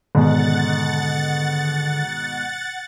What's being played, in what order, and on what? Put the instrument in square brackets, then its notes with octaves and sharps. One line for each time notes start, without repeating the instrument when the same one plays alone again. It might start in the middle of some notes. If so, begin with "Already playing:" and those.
[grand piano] G#2 B2 [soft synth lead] D3 [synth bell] D#3 [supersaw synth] F#5 A6